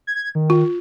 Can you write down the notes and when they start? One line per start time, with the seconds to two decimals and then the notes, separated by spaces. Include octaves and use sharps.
0.07 G#6
0.35 D#3
0.50 F4